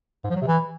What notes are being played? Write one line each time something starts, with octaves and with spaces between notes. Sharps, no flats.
G#2
F3
F#3
C3
E3